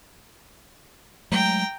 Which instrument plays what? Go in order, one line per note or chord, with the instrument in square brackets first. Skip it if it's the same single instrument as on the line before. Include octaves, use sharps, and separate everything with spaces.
[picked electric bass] F#3 G#3 A3 [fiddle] G5 A#5